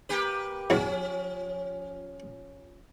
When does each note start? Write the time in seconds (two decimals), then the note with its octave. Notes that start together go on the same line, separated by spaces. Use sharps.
0.09 A#3 G4 B4
0.70 E2 F3 F#3 C#4